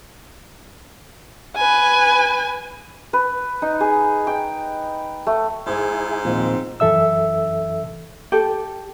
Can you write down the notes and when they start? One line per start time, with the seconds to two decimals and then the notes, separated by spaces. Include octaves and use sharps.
1.56 B4 G#5
3.13 B4
3.62 D#4
3.80 G#4
4.27 G5
5.26 A3
5.66 G#2 E4 G#4 C5 G#5
6.25 D#2 A#2 F3 C4 G#4
6.80 F#2 E3 A4 E5 E6
8.32 G4 A4